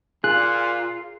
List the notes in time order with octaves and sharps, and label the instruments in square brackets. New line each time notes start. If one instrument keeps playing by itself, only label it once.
[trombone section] A#2 [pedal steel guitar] F4 [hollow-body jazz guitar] G#4 [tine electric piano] F#6